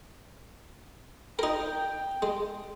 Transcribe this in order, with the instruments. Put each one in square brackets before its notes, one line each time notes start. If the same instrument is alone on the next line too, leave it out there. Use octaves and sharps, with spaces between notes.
[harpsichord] D#4 A#4 [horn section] G5
[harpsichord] G#3